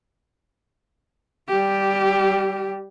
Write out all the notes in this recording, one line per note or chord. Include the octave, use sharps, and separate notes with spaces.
G3 G4